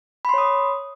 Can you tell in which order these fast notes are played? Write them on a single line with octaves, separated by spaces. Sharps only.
B5 C6 C#5 D#6